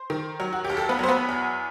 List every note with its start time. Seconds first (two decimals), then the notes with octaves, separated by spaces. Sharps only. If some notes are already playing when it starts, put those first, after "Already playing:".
Already playing: C5
0.10 D#3
0.40 F#3
0.53 F#4
0.65 D#2 G4
0.77 A4
0.89 B3 B4
0.99 F#3 C5
1.09 B3 B4
1.29 E2